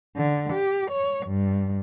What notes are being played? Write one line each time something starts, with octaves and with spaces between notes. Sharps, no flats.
D3
G4
C#5
G2